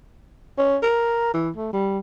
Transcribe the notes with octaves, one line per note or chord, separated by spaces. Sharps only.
C#4
A#4
E3
A3
G3